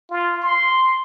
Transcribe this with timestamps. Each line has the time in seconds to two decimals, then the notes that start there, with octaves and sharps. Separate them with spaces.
0.11 F4
0.43 C6